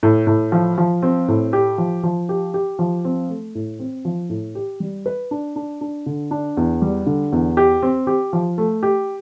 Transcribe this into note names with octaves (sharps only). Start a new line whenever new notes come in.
A2
A2
F3
F3
C4
A2
G4
F3
F3
G4
G4
F3
C4
A3
A2
C4
F3
A2
G4
G3
B4
D4
D4
D4
D3
D4
E2
G3
D3
E2
G4
C4
G4
F3
A3
G4